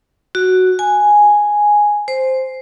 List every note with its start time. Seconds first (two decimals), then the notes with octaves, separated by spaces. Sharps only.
0.35 F#4
0.79 G#5
2.08 C5